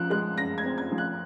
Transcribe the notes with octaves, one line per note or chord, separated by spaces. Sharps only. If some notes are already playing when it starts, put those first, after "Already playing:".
Already playing: F3 F#6
G#3 F#6
F#2 A#6
G#6
C4
G#6
F3
F#6